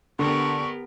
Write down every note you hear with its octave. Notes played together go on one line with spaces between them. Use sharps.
D3 B3 G4 A#4 C#6